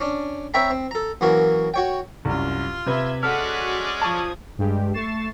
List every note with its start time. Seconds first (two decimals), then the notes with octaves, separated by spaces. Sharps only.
0.01 C#4 D4
0.54 C4 C#5 E5 G5 A#5 B5
0.71 C4
0.91 A4 A#5
1.21 F#2 E3 A#3 F#4 A#4
1.74 F#4 C#5 G5
2.25 C2 F#2 F4
2.86 C3 B4 E5 B5 G#6
3.23 G#3 C#4 F#4 A4 D5 F#5 F6 B6
4.02 F3 A5 C#6 D#6 G#6
4.58 G2 G#3 G4
4.94 A3 C#6 A6 C7 E7